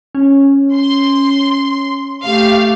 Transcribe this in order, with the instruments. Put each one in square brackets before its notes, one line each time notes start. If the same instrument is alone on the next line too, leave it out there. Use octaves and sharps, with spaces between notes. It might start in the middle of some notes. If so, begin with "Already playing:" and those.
[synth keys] C#4
[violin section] C6
[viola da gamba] A3 [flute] G4 [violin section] F5